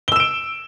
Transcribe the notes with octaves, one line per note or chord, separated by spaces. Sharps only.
E6 D7 E7 G7